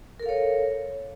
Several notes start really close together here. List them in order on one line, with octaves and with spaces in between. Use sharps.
A#4 A4 F5 C#5